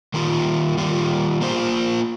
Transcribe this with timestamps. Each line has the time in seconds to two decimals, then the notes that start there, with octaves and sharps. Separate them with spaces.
0.14 D#3 G3 A#3 F4
0.77 D#3 G3 A#3 F4
1.41 A#3 F4 C5